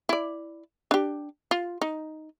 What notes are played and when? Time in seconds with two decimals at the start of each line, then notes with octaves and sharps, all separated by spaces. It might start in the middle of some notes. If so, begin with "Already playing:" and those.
0.09 E4 D5
0.91 D4 G4
1.51 F4
1.82 D#4